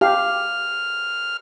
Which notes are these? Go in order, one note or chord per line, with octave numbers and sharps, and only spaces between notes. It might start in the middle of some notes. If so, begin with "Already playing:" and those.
G4 F5 F6